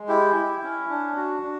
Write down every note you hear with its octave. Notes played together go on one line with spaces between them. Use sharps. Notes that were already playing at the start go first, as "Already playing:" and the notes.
Already playing: G#3
E4 G4
E4
C#4
D4
F#4
D4